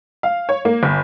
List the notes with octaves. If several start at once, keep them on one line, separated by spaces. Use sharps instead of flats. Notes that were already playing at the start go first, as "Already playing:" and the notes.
F5
C#5
A#3
G1